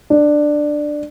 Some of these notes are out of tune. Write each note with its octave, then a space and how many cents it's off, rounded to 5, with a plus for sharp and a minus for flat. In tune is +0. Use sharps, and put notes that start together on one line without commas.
D4 +10